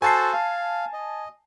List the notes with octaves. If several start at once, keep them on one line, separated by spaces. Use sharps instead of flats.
F#4 A4 C5 G#5 A5 C7
F5
D#5